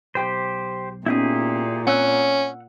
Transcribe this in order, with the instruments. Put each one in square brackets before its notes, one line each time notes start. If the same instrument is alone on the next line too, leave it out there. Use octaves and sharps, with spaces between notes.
[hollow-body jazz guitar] B1 G5 B5 [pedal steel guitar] G4 C5
[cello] A#2 [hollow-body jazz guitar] B3 C#4 D#4 [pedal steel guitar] E4 G4 G#4
[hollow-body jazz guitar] C4 [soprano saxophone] C#4 [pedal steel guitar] F#5 E6 F#6